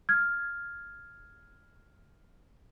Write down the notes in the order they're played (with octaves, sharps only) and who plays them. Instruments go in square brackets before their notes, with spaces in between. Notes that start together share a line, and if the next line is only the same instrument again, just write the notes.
[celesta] F6 G#6